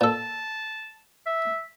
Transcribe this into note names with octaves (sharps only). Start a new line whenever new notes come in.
A#2 A4 A5
E5